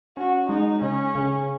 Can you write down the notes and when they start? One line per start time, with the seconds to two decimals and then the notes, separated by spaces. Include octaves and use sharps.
0.17 C#4 F#4
0.49 G#3 D#4
0.82 C#3 C#4
1.15 C#3